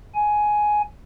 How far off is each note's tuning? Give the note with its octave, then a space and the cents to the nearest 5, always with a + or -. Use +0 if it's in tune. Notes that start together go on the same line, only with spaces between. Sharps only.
G#5 +10